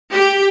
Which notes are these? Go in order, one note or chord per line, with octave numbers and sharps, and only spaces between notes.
G4